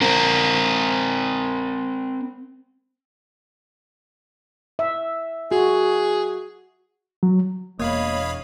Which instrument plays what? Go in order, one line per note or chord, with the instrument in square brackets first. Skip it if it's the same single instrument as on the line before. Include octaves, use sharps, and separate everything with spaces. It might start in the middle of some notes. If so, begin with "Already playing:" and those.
[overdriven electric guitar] C4 A#4
[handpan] E5
[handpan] F#4 [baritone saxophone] G#4
[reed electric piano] F#3
[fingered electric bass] E1 [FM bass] A#3 [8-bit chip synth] C#5 F5 B5 [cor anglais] D#5